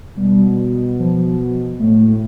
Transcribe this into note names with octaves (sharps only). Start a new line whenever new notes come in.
B2 G3
F3
A2 A3